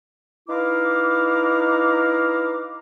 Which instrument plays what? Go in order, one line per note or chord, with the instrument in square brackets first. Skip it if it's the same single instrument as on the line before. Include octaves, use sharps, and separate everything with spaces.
[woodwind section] D#4 E4 B4 F5 A#5 D6